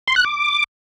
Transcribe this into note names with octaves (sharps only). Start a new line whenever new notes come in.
C6
F#6
D6